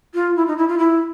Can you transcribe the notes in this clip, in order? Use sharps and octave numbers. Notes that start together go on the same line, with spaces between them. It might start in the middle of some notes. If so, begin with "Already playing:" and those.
F4
E4
D#4
E4
F4
E4